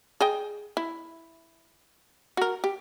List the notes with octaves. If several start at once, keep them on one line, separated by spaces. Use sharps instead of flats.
G#4 D#5 G5
E4
F#4 A#4
G4